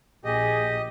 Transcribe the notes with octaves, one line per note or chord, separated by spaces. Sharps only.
A#1 G4 G#4 D#5